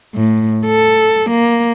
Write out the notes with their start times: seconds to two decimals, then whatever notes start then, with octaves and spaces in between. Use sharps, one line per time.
0.15 A2
0.66 A4
1.30 A#3